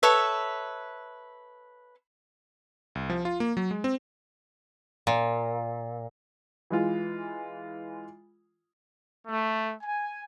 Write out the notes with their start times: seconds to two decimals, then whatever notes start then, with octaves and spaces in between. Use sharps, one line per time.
0.03 A4 B4 C#5 E5
2.95 C2
3.10 F3
3.25 F4
3.40 A#3
3.57 F#3
3.71 G#3
3.84 C4
5.07 A#2
6.70 E3 G#3 F4
9.27 A3
9.83 G#5